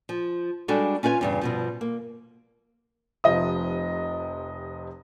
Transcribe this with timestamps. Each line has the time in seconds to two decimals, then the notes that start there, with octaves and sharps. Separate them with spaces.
0.09 F3
0.68 G3 G#3 D4 F#4 A4
1.03 C#4 F4 B4 F#5 G#5
1.21 E2 G2 C#3
1.41 G2 B2 F3
1.81 A#3
3.24 F1 C3 F3 D#5 D#6